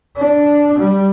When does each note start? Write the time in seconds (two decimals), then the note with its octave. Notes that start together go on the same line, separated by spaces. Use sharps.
0.17 D4
0.78 G3